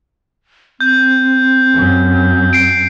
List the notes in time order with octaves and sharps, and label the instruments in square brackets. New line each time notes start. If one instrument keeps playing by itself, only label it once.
[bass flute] C4 [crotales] G6
[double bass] F#2
[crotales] C7 D7